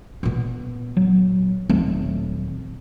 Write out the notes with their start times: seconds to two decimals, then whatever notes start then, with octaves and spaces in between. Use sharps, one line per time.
0.23 A#2 B3
0.97 F#3
1.69 D#1 D#3 F#3 A3 C4